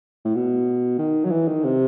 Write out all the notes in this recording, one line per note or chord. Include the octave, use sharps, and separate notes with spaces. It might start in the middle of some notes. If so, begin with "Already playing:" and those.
A2
B2
D#3
F#3
E3
D#3
C3